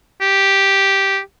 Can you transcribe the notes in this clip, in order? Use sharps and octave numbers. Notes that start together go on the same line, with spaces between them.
G4